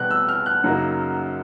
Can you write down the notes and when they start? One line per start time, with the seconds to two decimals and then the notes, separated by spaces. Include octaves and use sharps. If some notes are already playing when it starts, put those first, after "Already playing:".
Already playing: B1 B2 G3 B3 F#6
0.11 E6
0.29 F6
0.46 F#6
0.64 F#2 C#3 F#3 A#3 D#4